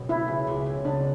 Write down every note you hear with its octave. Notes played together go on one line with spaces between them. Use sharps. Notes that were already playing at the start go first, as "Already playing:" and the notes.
Already playing: F#1 B2
B3 E4
C#3
C#2
C#3
B3 D4